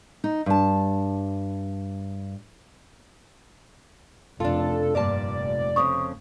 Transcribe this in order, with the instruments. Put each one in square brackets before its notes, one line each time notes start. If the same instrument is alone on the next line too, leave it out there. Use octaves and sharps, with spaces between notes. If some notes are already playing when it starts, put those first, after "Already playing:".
[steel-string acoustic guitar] D#4
G2 A5
[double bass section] F1 [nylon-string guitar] D4 F4 [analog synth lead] A4
[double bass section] F1 [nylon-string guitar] G2 A#2 A5 [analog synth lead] D5
[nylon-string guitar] F2 C#3 C4 [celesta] C#6 D#6